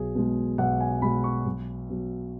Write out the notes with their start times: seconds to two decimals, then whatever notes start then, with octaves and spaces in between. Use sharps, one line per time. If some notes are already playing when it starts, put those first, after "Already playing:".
Already playing: B1 G#4
0.15 B2 G#3
0.58 B1 F#5
0.80 G#5
1.02 B2 G#3 B5
1.24 C#6
1.46 B1
1.89 B2 F#3